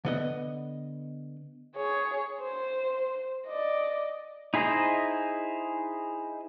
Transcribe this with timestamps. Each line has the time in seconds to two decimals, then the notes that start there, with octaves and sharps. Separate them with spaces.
0.05 D3 B3 D#5
1.77 G#4 C#5
2.40 C5
3.48 D5 D#5
4.54 D#4 E4 G#4 C5 D#5